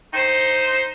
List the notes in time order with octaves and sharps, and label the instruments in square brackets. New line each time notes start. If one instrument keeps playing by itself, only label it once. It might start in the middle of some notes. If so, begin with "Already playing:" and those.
[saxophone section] D#4 C5